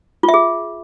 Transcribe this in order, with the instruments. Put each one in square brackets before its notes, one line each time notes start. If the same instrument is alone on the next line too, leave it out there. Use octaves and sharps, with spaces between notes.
[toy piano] F4
E5
G#4